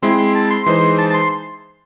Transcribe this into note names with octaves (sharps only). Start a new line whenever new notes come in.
G#3 C4 E4 C6
C6
A5
C6
E3 G#3 D#4 G#4 C5 C6
A5
A5
C6